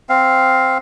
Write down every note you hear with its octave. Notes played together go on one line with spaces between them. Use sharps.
C4 F5